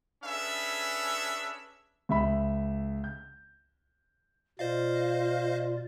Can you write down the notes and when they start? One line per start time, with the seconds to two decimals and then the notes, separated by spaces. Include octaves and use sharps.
0.23 C#4 D4 G#4 A4 B4 E5
2.09 C#2 E5 B5
3.04 G6
4.59 B2 F4 C5 D5 D#5 F5